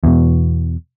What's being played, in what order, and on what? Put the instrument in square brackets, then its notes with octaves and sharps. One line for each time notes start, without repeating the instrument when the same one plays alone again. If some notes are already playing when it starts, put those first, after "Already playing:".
[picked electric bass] E2 B2